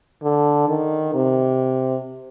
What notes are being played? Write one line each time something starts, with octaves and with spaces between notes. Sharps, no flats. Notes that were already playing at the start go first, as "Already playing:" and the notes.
D3
D#3
C3